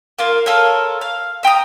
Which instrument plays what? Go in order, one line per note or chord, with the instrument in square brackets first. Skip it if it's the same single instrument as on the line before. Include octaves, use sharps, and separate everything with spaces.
[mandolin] A#3 F4 A#4
F4 A4 A#4 C#5
F5
E5 G5 A#5 D#6